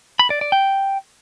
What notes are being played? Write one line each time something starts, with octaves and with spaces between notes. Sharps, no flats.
B5
D5
D5
G5